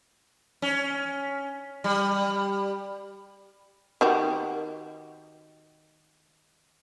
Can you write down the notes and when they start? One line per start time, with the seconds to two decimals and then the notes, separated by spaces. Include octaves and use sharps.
0.62 C#4
1.84 G3
4.01 D#3 F#4 G4